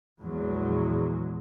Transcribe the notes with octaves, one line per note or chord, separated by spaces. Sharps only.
A#1 E2 F#3 G#3